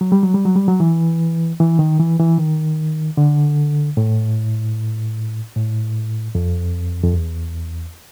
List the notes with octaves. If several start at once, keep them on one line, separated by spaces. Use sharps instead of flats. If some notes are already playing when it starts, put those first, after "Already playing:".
F#3
G3
F#3
G3
F#3
G3
F#3
E3
E3
D#3
E3
E3
D#3
D3
A2
A2
F2
F2
E2